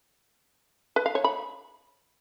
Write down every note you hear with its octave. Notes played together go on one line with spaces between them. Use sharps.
B4
F5
C#5
B5